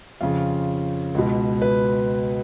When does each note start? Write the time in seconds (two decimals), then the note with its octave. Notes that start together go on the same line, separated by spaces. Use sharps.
0.21 F2 C#3 F4
1.15 C#2 B2
1.62 B4